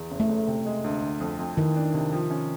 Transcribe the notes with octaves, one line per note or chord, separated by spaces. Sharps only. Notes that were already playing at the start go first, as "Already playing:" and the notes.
Already playing: E2
F#1
A3
F#1
C3
G#3
D2
D3
F2
F2
D#3 E3
D4
C3
F3
C#4